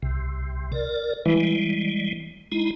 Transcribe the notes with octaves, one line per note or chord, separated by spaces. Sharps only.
C2 C3
A#4 D5
E3 G3 G#3
G#3 D#4 E4